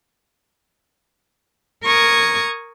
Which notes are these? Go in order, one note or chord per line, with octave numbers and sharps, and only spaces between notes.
A#4 C#6 D#6 G#6